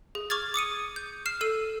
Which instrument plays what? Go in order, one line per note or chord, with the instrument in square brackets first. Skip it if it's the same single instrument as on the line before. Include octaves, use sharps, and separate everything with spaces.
[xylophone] G#4
C#6 D6 F6 G#6 A6
D6 D#6 C#7 D#7
G6
F6 C7 E7
A4 E6 D#7